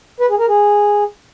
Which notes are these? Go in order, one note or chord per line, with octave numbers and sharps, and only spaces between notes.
B4
G#4
A#4
G#4